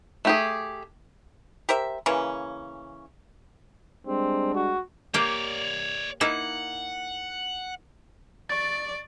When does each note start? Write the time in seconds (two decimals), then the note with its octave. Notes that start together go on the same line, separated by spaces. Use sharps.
0.25 A3 G4 G#4
1.69 G4 A#4 C5 E5
2.06 C#3 E3 A#3 C#4
4.07 G3 G#3 C4 D4
4.55 F#4
5.14 A#3 G4 C#5 D5
6.21 A#3 D#4 E4 F#5
8.50 D5 C#6 A6